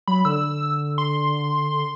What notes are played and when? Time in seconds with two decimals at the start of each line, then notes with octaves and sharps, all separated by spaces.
0.07 F#3 B5
0.25 D3 E6
0.98 C6